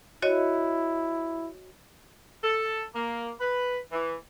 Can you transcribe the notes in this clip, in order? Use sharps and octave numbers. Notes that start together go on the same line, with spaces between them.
E4 F#4 C#5 D#5
A4
A#3
B4
E3